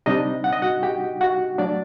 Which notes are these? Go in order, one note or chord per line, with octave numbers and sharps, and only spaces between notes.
C3 G3 D4 D#4 D#5
F#5
D#5
F#4 F#5
G4 G5
F#4 F#5
F#3 A3 D4 D5